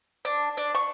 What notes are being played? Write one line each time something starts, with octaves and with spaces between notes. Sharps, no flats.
D4
D4
C#6